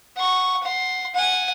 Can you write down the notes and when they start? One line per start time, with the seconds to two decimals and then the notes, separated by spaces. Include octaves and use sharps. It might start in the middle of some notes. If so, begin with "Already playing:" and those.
0.17 F#5 C#6
0.63 F#5 C6
1.14 F#5 G#5